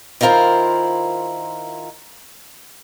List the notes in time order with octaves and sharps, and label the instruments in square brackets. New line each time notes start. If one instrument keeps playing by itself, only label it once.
[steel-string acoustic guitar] D#3 E4 F4 A#4 C5